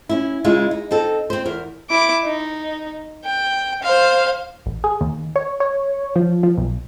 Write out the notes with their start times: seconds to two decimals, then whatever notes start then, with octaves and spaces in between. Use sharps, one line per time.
0.09 C#4 E4
0.44 C#3 G#3 E4 F4
0.71 D#4
0.91 C4 D#4 A4
1.30 C4 C5
1.45 E2 A#4
1.90 E4 D6
2.24 D#4
3.25 G5
3.83 C5 F5
4.66 A1
4.84 G#4
5.01 D#2
5.36 C#5
5.60 C#5
6.16 F3
6.43 F3
6.57 B1